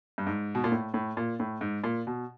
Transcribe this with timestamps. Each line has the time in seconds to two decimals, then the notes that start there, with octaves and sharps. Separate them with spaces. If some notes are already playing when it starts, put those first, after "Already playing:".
0.18 G2
0.27 G#2
0.55 B2
0.64 A#2
0.72 A2
0.94 A2
1.17 A#2
1.40 A2
1.61 G#2
1.84 A#2
2.07 B2